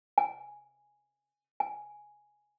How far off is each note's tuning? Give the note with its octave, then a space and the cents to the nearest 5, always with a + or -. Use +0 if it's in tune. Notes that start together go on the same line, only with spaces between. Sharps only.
G#5 +0
G#5 +5